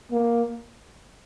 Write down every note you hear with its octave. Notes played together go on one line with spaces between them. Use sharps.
A#3